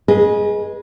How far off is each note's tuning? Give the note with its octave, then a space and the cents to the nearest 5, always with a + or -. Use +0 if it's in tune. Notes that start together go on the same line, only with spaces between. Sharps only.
G#4 +0 B4 -30 D#5 +0